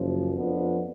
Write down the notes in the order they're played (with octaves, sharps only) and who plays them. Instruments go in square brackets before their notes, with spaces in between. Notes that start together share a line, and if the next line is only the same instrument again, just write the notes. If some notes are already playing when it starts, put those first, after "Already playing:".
Already playing: [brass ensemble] F#1 F#2 F3
F2 F3 B3 D4 F4